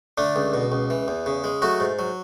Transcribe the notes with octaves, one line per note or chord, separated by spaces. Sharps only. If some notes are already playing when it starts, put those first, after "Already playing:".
D3 A3 D4
C#2
B2
C#2
E3
E2
C#3
G#3
F#3 A3 F#4
G#2
F#3